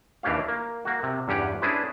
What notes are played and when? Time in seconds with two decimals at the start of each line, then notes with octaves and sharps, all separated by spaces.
0.23 D#2 E3 D4 G4 C#5 F5
0.48 A#3
0.85 A#3 F#4
1.03 C3
1.28 E2 G2 C#4 G4 F#5
1.62 C#4 D4 E4 G#4 B4 C5